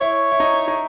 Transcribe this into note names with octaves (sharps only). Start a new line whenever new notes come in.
E4 C#5
E4
D#4
D#4